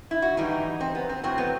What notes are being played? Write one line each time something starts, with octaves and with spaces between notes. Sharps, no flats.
E4
F#4
A2 E3 G3 D#4
C4
B3
C4
A2 F#3 C4
B3